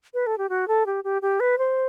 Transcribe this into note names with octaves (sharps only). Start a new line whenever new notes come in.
B4
A4
G4
F#4
A4
G4
G4
G4
B4
C5